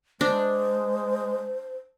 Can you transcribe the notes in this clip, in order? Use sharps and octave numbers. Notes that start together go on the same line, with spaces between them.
G#3 D4 C5